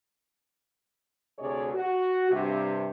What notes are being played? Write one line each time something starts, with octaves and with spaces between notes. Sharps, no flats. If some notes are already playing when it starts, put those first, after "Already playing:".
D2 C3 G#4 C#5 D5
F#4
G2 C3